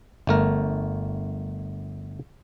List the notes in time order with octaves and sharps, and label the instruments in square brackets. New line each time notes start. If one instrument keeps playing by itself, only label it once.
[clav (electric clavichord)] G1 A3 A#4